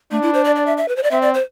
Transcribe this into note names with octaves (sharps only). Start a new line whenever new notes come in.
A3 D4
E4
C5
D5
D5
E5
E5
B4
C5
D5
C4 E5
D5
C5